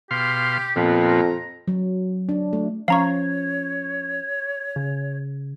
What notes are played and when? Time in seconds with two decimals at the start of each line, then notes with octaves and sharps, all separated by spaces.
0.11 B2 G4 F5 C6
0.76 F2 A#2 F3 B3
1.08 A#5
1.68 F#3
2.29 D4
2.53 A3
2.88 F3 C#4 C#5 F5 A#5 C#6
4.76 C#3